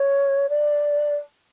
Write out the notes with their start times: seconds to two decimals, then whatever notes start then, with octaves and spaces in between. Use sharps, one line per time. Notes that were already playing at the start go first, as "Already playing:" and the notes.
Already playing: C#5
0.49 D5